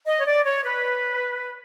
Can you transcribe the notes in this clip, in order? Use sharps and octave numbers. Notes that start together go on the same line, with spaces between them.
D#5
C#5
D5
C#5
B4